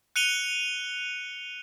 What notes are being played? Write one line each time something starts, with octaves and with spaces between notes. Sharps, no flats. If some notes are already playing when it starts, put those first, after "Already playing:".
F#6 C#7 D#7 F7 G7